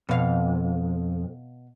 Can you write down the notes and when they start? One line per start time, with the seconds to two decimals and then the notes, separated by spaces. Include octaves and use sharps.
0.09 F2 B2 F5